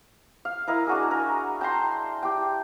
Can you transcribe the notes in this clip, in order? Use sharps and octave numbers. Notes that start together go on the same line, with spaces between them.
F5
E4 A#4 D#5 F5
D4 F#4 G#4
A#4
G5 A5 A#5 C6
G4 G5